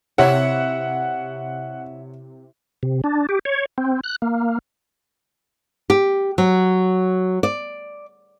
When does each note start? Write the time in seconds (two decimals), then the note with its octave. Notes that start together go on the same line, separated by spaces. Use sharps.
0.18 C3 E4 C#5 F#5
2.83 C3
3.04 D4
3.29 G4
3.45 C#5
3.78 C4
4.04 F#6
4.22 A#3
5.90 G4
6.38 F#3
7.43 D5